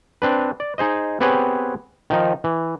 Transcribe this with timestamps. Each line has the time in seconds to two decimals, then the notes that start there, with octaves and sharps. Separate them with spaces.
0.22 C4 D4 B4
0.60 D5
0.78 D#4 G#4 C5 D#5
1.20 B3 C4 G4 G#4 B4 C#5
2.10 D#3 F3 D#4
2.44 E3